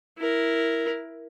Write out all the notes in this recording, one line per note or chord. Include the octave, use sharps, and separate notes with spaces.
E4 A#4